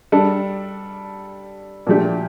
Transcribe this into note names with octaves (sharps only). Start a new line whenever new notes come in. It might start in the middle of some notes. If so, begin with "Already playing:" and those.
G3 D4 A4
A#2 F3 A3 D4 G4